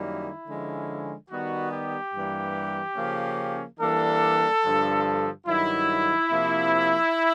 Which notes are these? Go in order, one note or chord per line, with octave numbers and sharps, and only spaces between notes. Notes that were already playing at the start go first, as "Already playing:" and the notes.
Already playing: F#2 D#3 G3 A#3 C#4 E4
D3 F3 G#3 C#4
D#3 G3 B3 D#4 F#4
G4
G2 E3 G3 A#3
C#3 F3 A#3 C#4
E3 G3 A#3 D4 A4
G2 D3 F3
G2 D#3 F#3 E4
C3 F3 A#3